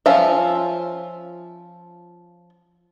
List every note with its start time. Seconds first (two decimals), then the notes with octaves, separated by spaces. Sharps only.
0.06 F3 C#4 F4 E5